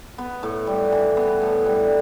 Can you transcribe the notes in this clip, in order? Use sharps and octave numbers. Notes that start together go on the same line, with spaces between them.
B3
A2
G3
E3
B3
A2
G3